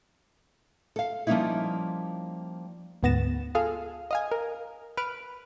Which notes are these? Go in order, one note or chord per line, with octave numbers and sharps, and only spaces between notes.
A4 F5
F3 G3 A#3 C#4 D#4 E4
D2 G#2 B3 A6 A#6 E7
F4 G#4 A4 F5
D#5 F5 G#5
A#4
B4 F6 D7